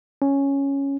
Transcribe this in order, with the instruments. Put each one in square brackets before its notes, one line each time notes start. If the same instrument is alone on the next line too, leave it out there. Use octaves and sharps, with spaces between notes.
[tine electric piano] C#4